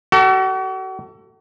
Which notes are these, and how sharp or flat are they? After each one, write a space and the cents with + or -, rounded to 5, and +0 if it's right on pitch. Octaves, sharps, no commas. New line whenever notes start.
F#4 +40 A4 +20